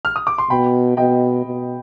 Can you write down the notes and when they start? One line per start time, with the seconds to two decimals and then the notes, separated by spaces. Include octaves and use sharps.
0.05 F6
0.16 D#6
0.27 D6
0.38 C6
0.50 B2 G5 B5
0.97 B2 D#5 G5
1.45 B2